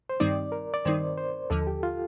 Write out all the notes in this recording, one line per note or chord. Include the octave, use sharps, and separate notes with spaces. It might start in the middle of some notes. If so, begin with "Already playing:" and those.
C5
G2 D#3 G3 C4 D#4 D5
A#4
D5
G2 D#3 G3 C4 D#4 C5
C5
D#2 D3 F3 A4
G4
F4